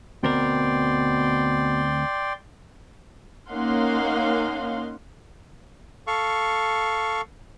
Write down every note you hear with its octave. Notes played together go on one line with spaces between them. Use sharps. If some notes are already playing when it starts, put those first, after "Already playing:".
D2 B2 C4 A#4 D5 G5 C6
A#3 C#4 D#4 F5 F#5 C6
A4 F5 C#6